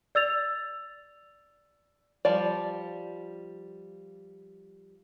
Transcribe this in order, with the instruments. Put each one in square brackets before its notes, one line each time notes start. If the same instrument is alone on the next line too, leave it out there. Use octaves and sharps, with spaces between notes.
[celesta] D5 E6 A6 F7
[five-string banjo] F3 G3 D5